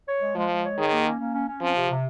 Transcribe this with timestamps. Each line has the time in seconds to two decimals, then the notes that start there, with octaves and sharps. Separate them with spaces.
0.08 C#5
0.21 G#3
0.35 F3 G#3
0.50 G#3
0.64 C#5
0.78 D#3 G#4
0.91 A#3
1.06 C#4
1.20 A#3
1.33 C#4
1.48 C#4
1.61 F3 C4
1.75 C3
1.89 C3